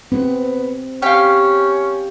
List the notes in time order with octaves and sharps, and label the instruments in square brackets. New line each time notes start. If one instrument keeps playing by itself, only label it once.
[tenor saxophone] B3 [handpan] C4
[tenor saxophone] C#4 [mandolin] G4 F5